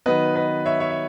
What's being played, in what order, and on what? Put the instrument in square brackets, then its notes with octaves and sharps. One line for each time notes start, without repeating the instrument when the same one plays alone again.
[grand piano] D#3 F#3 B3 B4 D#5
B4 D#5
C#5 E5
C#5 E5
E5